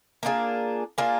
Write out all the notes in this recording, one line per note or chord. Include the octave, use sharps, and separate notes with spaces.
A#3 D4 F4 G#4
A#3 D4 F4 G#4